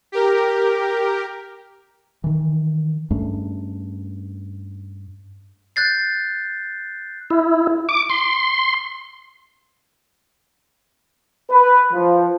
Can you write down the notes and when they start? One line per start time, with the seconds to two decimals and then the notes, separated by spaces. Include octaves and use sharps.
0.12 G4 A#4
2.24 D#3 E3
3.11 G2 A3 C#4 D4
5.76 F#6 G6 A6 C7
7.30 E4
7.89 D6
8.10 C6
11.50 B4
11.93 F3